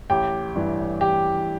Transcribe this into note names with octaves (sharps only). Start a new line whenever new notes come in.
A1 G4 G5
G2 E3
A1 G4 G5